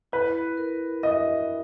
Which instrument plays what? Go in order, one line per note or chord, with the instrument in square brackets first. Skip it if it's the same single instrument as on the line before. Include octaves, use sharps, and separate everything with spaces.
[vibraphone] E4 [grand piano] B4
[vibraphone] A#4
[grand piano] D#5 [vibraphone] E5